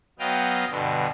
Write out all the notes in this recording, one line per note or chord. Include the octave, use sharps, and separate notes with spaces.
F#3 B3 D#5 F5 G5 F6
G2 B2 D3